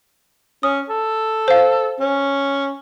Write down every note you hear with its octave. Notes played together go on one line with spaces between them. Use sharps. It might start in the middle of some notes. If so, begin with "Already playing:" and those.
C#4 D#6
A4
C5 F5
C#4